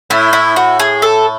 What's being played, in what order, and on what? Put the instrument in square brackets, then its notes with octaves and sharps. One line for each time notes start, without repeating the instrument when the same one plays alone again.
[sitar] A2 [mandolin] E4
[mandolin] E4
F#4
G#4
A4